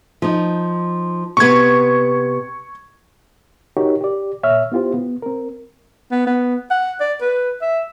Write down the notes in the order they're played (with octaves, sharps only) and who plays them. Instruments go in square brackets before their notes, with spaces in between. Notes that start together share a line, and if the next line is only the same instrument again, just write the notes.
[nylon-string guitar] F3 D#4
[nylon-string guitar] C3 B3 [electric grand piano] C#6 G#6
[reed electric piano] D#4 F#4 G4 A#4 C#5
G4 D5
A#2 C#5 E5 F6
B3 E4 F4 G4 C5
B3
C4 A#4
[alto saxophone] B3
B3
F#5
D5
B4
E5